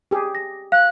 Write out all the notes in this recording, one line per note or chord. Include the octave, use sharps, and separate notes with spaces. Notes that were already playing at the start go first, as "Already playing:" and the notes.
G4 G#4
A#6
F5 F#6